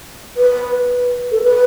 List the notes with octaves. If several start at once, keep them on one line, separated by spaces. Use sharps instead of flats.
B4
A4
B4